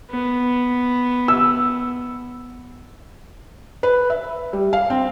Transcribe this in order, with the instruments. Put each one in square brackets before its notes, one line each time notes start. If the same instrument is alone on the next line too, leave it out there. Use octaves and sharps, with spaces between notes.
[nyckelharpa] B3
[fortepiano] E6
[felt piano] B4
E5
G3
F5
C4